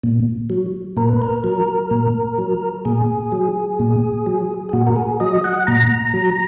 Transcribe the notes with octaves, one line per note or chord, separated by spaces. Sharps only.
A#2
F#3
A#2 A#4
B4
A#4
F#3
A#2
F#3
A#2 G#4
F#3
A#2
F#3
G#4
A#2 F#4
A#4
G#4
F#3 D#5
F#5
A#2 A#5
F#3